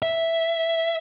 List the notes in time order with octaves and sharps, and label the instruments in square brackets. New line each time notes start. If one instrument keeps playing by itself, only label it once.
[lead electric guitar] E5